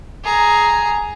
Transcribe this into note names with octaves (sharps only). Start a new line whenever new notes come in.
G#4 A#5